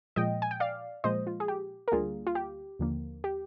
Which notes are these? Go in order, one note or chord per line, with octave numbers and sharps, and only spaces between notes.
A#2 F3 G#3 D#5 G5
G#5
G5
D5 F5
A#2 F3 G#3 C5 D#5
F4
G#4
G4
A#4
D2 D3 G3 A#3 F4 G#4
F4
G4
D#2 D3 F3 A#3
G4